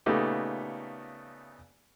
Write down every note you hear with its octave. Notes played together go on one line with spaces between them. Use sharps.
A#2 C#3 A3 B3 D#4 G4